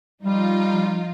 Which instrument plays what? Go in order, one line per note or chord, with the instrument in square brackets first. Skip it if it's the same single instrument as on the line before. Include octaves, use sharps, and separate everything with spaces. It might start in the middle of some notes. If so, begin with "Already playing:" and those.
[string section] F3 D#4 F4 [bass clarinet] G3